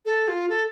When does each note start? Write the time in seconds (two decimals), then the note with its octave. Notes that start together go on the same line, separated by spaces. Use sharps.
0.05 A4
0.28 F4
0.49 A4